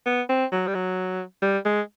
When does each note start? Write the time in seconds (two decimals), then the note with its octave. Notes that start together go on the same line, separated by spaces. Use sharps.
0.06 B3
0.29 C4
0.52 F#3
0.67 G3
0.75 F#3
1.42 G3
1.65 G#3